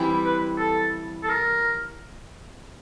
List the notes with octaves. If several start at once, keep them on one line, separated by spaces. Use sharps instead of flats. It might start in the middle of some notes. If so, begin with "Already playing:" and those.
Already playing: E3 G3 C4 E4
B4
A4
A4
A#4